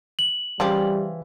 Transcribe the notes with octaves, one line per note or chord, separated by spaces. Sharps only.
F#7
C#3 E3 F3 G3 G4